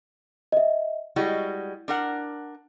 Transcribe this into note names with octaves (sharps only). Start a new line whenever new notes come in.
D#5 E5
G3 G#3 E4 F#4
D4 A#4 F#5